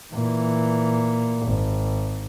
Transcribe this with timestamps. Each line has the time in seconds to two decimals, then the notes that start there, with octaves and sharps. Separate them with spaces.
0.13 A#2 E3
1.46 G#1